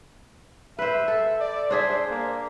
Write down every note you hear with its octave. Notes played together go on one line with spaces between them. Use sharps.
B4 C5 E5
A4
D5
D4 G#4 C5 E5
A#3